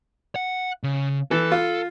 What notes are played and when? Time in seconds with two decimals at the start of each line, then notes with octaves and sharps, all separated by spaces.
0.36 F#5
0.83 C#3
1.31 E3 A4
1.52 F4